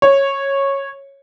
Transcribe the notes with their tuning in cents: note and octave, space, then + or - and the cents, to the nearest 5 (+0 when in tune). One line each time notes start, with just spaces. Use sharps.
C#5 -10